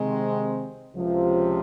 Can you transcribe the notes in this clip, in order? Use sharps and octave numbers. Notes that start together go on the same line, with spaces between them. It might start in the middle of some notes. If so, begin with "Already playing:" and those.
Already playing: C3 D#3 G#3 C4
C#2 C3 F3